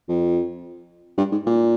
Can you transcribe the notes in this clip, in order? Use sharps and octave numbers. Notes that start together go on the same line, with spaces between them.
F2
G2
G#2
A#2